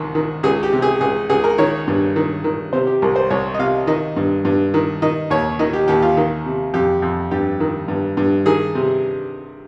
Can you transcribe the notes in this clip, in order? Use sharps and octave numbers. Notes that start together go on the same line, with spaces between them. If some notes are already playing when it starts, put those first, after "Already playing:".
Already playing: C2 D#3
D#3
C#2 G#4
G4
C3
G#4
C#2 G#4
C#2 G#4
A#4
D#3 C#5
G2
D#3
D#3
C3 C5
G4
C2 A#4
C5
C2 C#5
D#5
C3 F5
D#3 D#5
G2
G2
D#3
D#3 D#5
D#2 C#5
D#3 D#5
G4
D#2 G4
F4
D#3
C3
F2 G4
F2
G2 G4
D#3
G2
G2
D#3 G#4
C3